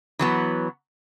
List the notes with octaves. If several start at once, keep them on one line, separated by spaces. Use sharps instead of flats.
E3 F#3 B3